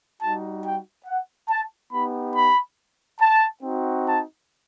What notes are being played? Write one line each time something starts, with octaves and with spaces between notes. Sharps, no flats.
G3 D#4 F#4 A5
G5
F#5
A5
B3 D#4 G4 B5
B5
A5
C4 D#4 F#4
A5